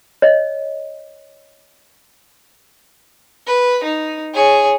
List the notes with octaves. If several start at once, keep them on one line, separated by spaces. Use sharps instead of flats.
C#5 D#5
B4
D#4
G#4 C#5